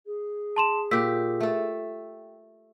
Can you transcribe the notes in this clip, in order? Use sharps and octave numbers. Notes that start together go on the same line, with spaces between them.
G#4
A5 C6 E7
A#2 G4 E6 B6
A3 A4